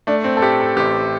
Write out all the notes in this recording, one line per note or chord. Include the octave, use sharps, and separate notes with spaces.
A3 D4
C4
A4
A2 G4
A4
A1 G4